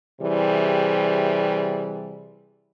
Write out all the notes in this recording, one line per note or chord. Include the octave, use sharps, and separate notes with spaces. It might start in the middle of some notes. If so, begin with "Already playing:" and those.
C3 E3 G3 G#4